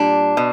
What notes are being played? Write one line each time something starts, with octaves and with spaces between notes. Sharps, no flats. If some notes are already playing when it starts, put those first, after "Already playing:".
Already playing: A#2 G3 D4
B2